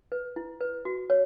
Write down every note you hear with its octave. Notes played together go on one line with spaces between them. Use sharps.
B4
E4
B4
F#4
C#5